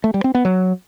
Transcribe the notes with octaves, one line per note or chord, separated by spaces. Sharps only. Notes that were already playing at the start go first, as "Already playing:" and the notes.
A3
G3
C4
B3
F#3